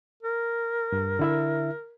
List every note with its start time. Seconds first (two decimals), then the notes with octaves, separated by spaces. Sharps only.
0.22 A#4
0.92 G2
1.19 D3 E4 E5